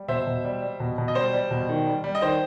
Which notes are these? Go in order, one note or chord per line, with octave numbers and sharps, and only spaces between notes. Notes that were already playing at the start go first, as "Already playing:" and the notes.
Already playing: G3
B2 C5 E5
B2
G3
G3
B2
B2
D#5
G3 C5
G3
B2
D#3
G3
G3
D#5
D#3 C5